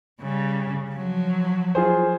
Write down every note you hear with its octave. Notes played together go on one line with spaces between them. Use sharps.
C#3 G3
F3 F#3
F4 G#4 C5